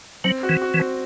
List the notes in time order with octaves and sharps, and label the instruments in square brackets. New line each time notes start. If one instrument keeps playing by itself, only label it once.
[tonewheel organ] F#3 [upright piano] C4
[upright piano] F#4
[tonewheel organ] E3
[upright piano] F#4
[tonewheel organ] E3
[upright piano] C4